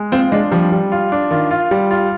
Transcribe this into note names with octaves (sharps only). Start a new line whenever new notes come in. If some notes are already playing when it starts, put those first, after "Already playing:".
Already playing: G#3
C4 F4
G#3 D4
F3 G3
G3
F4
D4
D#3 F4
F4
G3
F4